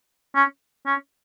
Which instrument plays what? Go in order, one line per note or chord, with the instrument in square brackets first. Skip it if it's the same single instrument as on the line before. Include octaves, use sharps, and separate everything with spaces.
[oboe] C#4
C#4